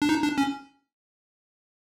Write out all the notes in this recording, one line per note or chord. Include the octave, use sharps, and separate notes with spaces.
D4
D#4
D4
C#4